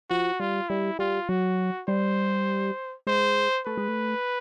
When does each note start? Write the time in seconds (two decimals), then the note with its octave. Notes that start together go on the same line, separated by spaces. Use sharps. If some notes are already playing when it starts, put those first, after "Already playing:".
0.10 F3 F#4
0.40 G3 F4
0.69 G3 E4
0.99 G3 F4
1.29 F#3 F#4
1.88 G3 C5
3.07 G#3 C5
3.66 A3 B4
3.77 G#3
3.88 A3